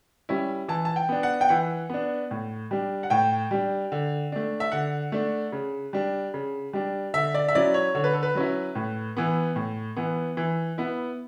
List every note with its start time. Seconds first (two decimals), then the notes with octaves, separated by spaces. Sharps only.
0.29 G3 C#4 E4
0.68 E3 A5
0.85 A5
0.96 G5
1.09 B3 D4
1.23 F#5
1.41 G5
1.49 E3 F#5
1.90 B3 D4
2.31 A2
2.71 G3 D4
3.03 F#5
3.10 A2 G5
3.51 G3 D4
3.92 D3
4.32 A3 D4
4.60 E5
4.72 D3 F#5
5.12 A3 D4
5.52 C#3
5.93 G3 D4
6.34 C#3
6.73 G3 D4
7.14 D3 E5
7.34 D5
7.48 E5
7.55 F#3 C#4 E4 D5
7.74 C#5
7.95 D3 C#5
8.04 B4
8.13 A4
8.23 B4
8.35 F#3 C#4 E4
8.75 A2
9.17 E3 B3
9.56 A2
9.96 E3 B3
10.37 E3
10.78 B3 E4